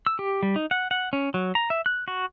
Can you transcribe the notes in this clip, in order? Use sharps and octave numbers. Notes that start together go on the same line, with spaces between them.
E6
G4
G3
D#4
F#5
F#5
C#4
F#3
A#5
E5
F#6
F#4